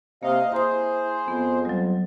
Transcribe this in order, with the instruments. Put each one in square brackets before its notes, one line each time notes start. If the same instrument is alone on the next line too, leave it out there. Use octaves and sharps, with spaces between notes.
[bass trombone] C3 [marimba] A#3 [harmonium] D#5 F5
[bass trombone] E4 [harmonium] G#4 C5 [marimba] A#5 D#6
[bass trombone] F2 [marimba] B3
[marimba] F#3 G3